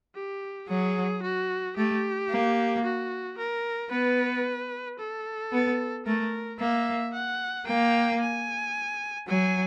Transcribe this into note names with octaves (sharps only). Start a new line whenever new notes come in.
G4
F#3 G#4
F#4
A3 G4
A#3
F#4
A#4
B3 B4
A4
B3
A3 A#4
A#3 E5
F#5
A#3 G5
G#5
F#3 G#5